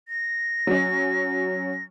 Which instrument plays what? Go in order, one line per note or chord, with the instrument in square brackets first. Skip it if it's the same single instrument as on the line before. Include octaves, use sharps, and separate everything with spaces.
[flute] A#6
[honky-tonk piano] F#3 C#4